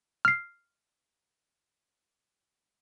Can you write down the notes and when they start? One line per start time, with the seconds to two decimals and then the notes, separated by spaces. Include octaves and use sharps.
0.25 F6 C7